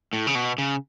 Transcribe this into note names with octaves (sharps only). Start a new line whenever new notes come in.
A2
C#3
B2
C#3